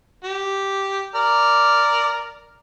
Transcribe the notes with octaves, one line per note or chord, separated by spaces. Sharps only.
G4
A#4 D5 F6